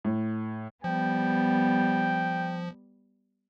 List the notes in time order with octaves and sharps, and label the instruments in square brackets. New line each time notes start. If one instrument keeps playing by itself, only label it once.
[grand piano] A2
[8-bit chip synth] F3 [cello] G3 B3 [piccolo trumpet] G5